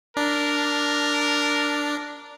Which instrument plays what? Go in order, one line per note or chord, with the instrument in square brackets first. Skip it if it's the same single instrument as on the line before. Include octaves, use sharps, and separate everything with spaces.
[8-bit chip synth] D4 [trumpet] A#4